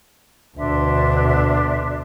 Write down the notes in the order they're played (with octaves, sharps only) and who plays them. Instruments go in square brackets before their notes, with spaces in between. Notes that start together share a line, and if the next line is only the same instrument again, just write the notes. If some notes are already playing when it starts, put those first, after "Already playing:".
[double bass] D2 B2 [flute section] D4 E5 C6